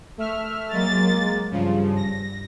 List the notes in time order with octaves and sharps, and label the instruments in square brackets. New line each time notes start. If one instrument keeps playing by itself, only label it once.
[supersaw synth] A3 E5 F6
[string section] F#3 A6 [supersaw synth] G#3 A#3
[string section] G2 [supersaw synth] C#3 F3
[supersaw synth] A#6